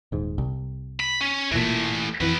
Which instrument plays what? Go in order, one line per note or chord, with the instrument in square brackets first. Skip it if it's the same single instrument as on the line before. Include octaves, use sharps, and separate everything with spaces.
[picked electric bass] D#1 G#2
C2
[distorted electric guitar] B5
C#4
[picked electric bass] E1 A#2 [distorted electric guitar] E3 A3
[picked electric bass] F2 E3 [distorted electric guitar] F#3 B4